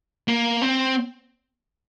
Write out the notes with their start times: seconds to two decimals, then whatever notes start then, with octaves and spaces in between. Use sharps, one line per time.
0.28 A#3
0.62 C4